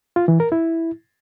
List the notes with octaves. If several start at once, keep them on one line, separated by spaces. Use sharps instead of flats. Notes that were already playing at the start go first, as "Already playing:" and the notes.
F4
E3
A#4
E4